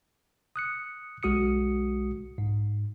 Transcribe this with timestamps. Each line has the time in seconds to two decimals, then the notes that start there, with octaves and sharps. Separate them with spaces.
0.56 D#6 F#6 C#7
1.23 B1 G#3 F#4 D#6 C#7
2.38 G#2